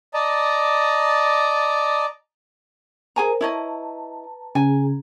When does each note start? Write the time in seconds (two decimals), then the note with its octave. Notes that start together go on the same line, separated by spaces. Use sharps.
0.14 D5 D#5 A5 A#5
3.16 G#4 A#4 C5 G#5 A#5
3.41 E4 B4 C#5 D#5 A5 A#5
4.55 C#3 G#4 G#5 A#5